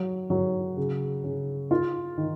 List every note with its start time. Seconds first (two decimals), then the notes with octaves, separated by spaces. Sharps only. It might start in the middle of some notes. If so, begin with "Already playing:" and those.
Already playing: F#3
0.30 F#3
0.77 C#3
1.24 C#3
1.71 F4
2.17 D#3